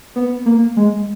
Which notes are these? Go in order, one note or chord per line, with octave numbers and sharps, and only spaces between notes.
B3
A#3
G#3